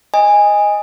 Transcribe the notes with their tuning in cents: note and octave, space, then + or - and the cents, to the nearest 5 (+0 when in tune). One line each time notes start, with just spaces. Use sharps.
D#5 +0 G#5 -15